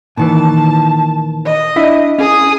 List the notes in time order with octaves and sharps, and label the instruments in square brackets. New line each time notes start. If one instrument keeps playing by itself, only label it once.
[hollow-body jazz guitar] A#2 D#3 E3 [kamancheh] A5
[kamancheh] D#5
[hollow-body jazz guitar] D4 E4 E5
[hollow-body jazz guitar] C#4 [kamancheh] G#4 D#6